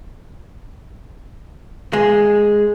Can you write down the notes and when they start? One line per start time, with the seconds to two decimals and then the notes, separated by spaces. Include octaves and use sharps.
1.93 G#3